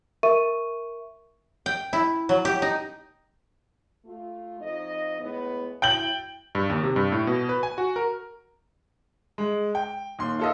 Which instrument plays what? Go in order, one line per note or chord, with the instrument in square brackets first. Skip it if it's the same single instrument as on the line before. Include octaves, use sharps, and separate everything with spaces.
[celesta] A#4 E5 C#6 D#7
[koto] G5
E4
F#3
G4
D#4
[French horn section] A3 F4
F2 D#4 D#5
A2 G#3 B3
[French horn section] F#3 E4 [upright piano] G5 G6 F#7
[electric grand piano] G2
D#2
C3
G2
A2
B2
B4
G#5
F#4
A#4
[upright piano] G#3
G5
D#2 C6
F4 A4 D#5